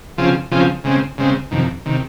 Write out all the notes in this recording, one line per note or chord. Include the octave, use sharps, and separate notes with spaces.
C#3 F3 C4 F4 G#4
C#3 F3 C4 F4 G#4
C#3 G#3 C4
C#3 G#3 C4
F2 C3 D#3
C3 D#3